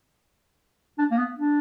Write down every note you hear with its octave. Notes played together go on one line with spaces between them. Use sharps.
D4
A#3
B3
D4